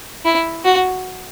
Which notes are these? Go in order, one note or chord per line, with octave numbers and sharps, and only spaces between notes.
E4
F#4